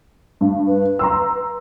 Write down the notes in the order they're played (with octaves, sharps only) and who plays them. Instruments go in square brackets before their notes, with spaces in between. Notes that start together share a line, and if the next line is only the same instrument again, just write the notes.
[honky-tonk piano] G2
[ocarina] B4
[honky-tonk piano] A#5 C6 E6